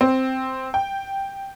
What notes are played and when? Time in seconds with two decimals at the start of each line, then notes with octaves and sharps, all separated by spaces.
0.01 C4
0.74 G5